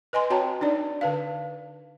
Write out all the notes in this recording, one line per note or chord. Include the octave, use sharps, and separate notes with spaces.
B4 D#5 G#5 C6
C4 F#4 C#5 G5 A5 A#5
D4 D#4 D5
D3 B4 F5